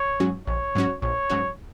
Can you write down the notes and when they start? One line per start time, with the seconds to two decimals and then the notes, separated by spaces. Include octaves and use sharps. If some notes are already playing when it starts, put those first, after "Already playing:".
Already playing: C#5
0.20 G#2 F#3 C#4 F#4
0.47 A#1 C#5
0.75 G#2 F#3 C#4 F#4
1.02 A#1 C#5
1.30 G#2 F#3 C#4 F#4